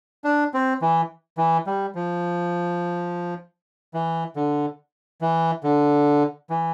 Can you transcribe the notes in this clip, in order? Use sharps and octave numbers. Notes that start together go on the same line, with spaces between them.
D4
C4
E3
E3
G3
F3
E3
D3
E3
D3
E3